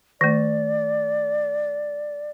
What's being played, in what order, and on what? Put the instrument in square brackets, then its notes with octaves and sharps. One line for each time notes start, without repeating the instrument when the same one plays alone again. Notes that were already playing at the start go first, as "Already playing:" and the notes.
[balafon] D#3 A3 [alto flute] D5